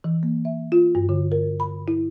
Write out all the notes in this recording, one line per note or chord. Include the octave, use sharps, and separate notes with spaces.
E3
A#3
E5
F4
G2
D3
A#4
B5
E4